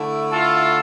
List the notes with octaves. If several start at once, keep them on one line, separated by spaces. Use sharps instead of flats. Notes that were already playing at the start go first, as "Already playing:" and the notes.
Already playing: D3 A3 E4
F4 A4